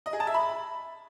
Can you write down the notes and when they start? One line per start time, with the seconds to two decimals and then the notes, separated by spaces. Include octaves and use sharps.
0.06 D#5
0.13 G#4
0.20 A5
0.27 E5
0.34 B5